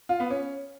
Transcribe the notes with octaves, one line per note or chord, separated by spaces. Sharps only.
F4
B3
C#4